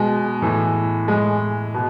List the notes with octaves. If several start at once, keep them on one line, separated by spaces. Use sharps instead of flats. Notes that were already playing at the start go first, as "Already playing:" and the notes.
Already playing: B2 G#3
A2 E3
A2 E3 G#3
B2